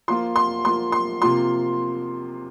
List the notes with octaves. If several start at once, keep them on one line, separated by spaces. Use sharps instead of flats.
F3 A#3 F4 C6
C6
F3 A#3 F4 C6
C6
C3 F3 A#3 F4 C6